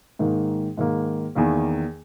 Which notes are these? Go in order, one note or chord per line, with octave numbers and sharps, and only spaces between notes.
G#2 D#3 A#3
G#2 D#3 A#3
E2 D#3 A#3